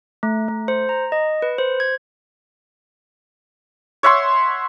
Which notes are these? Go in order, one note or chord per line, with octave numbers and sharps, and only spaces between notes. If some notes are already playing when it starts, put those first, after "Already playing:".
A3
A3
C5
A#5
D#5
B4
C5
G#6
C#5 E5 F#5 C6